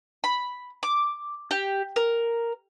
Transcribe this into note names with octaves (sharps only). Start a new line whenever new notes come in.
B5
D6
G4
A#4